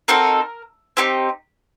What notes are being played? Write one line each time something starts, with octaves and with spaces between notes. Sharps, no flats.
C4 D#4 F#4 A4 A#4
C4 D#4 G4